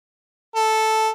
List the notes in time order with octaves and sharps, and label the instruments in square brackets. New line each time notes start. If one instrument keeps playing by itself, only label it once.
[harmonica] A4